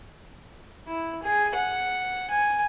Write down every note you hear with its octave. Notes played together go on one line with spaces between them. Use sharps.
E4
G#4
F#5
G#5